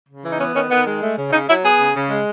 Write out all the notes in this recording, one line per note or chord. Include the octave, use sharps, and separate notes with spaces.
C#3
E3
D#4
B3 C#4
D#3 C#4
D#3 B3
G#3
A3
C#3
C#3 D#4
F#3 E4
B3 G#4
C#3
C#3
G#3